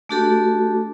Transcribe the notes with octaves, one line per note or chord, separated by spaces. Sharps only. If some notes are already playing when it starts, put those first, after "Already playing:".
A3 D4 F#4 G4 A4